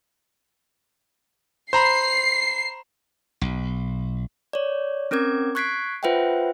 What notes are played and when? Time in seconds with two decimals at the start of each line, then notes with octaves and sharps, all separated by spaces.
1.73 C5 A#5 B5 C7
3.41 B1
4.53 C#5 D5
5.11 C4 C#4 A#4 D6 G#6
5.55 C#6 F#6 G#6 B6 C7 D7
6.03 F4 B4 C5 E5 F#5 G5